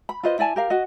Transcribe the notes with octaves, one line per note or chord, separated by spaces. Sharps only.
B5
F4 B4 C5 D#5
E4 D5 G#5 A5
G4 A#4 F5
F#4 D#5